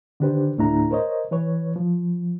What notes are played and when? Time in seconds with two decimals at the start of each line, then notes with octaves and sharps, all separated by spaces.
0.20 D3 D#3 D4 G4 B4 C5
0.58 D2 A2 A3 D4 E4 A#5
0.91 A#4 C5 C#5 D#5
1.31 E3 B4 C#5
1.76 F3